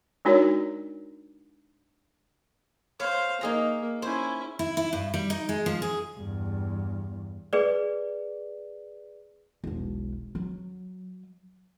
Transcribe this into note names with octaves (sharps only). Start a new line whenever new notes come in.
G#3 D4 D#4 F#4 A#4 C#5
C5 C#5 F5
A#3 D#4 G#4 A#5
C#4 E4 C5
E4
E4
G2
G3
D#4
G#3
F3
G#4
E2 G2
G#4 B4 D5
E1 B1
F#3